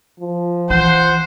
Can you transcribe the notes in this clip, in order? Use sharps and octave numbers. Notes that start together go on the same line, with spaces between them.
F3
E3 C5 F#5